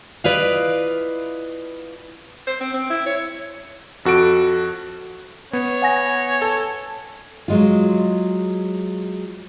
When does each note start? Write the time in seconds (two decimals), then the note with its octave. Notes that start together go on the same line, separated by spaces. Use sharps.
0.24 E4 F4 B4 D5 D#5 F5
2.47 C5
2.60 C4
2.74 C4
2.90 E4
3.06 C#5
4.05 F2 F#4 A4 D7
5.53 B3 C#5
5.82 F#5 G#5 A#6
6.42 A4 A5
7.48 F#3 G#3 F4